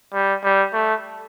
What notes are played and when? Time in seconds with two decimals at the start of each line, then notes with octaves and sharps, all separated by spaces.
0.13 G3
0.44 G3
0.73 A3